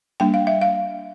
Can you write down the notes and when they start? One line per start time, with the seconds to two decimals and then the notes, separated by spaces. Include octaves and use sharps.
0.20 G3 A#3 D4 G5
0.34 F5
0.47 E5
0.61 F5